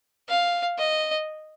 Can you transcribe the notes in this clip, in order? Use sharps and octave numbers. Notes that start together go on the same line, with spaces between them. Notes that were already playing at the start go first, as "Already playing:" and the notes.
F5
D#5